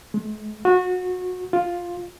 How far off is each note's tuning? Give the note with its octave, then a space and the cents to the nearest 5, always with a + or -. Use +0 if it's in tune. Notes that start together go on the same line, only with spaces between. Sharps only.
G#3 +45
F#4 -25
F4 +5